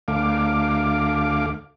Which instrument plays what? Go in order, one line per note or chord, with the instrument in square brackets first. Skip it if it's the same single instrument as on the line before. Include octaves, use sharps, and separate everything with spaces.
[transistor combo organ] D2 A3 F5 D6